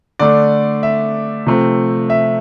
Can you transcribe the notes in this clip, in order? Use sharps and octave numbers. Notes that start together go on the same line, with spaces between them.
D3 A3 D4 D5
E5
C3 F3 A3 C4
E5